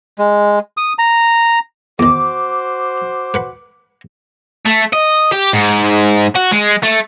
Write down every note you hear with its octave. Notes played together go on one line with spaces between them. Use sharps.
G#3
D#6
A#5
E2 D#3 F#4 C5 D6
B4 F#5 B5
A3
D#5
G4
G#2
F#4
G#3
A3